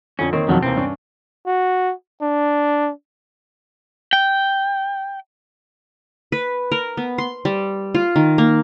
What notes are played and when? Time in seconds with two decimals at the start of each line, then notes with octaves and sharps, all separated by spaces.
0.19 F2 D3 C#4
0.33 D#3 A#3 C4 C#5
0.48 E1 F2 D#3 F#3 F#4 A5
0.63 D#2 C3 E3 C4
0.76 G2 C#4 D4
1.46 F#4
2.22 D4
4.13 G5
6.32 B4
6.72 A#4
6.97 B3
7.18 C6
7.45 G3
7.95 F4
8.16 D#3
8.38 A#3